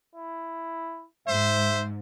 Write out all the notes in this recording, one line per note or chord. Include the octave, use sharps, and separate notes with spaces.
E4
G#2 C5 E5